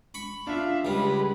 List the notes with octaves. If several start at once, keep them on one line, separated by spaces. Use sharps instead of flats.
B5 C#6
D4 F4 E5 F5
C#2 G3 G#3 B4